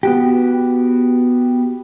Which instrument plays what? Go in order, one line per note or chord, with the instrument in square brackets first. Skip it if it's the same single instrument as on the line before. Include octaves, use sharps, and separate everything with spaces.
[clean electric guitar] B3 F#4 G4